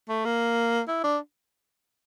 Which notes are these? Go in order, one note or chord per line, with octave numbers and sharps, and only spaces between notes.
A3
A#3
E4
D4